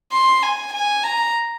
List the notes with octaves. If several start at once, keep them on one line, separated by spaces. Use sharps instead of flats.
C6
G#5
G#5
A#5